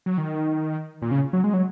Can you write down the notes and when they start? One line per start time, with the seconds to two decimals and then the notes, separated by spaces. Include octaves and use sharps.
0.06 F#3
0.18 D#3
1.02 A#2
1.11 C#3
1.33 F#3
1.44 G#3
1.54 F#3